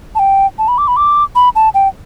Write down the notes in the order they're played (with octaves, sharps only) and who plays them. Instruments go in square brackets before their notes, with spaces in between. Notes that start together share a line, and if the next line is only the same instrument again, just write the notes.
[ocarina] A5
G5
A5
B5
D6
B5
D6
B5
A5
G5